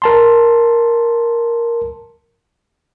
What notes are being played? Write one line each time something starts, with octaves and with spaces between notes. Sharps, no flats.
A#4 A5 C6